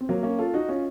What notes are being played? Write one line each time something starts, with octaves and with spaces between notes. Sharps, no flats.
C4
F#3 A#3
A#3 C#4
F4 A4
D#4 F#4
C#4 F4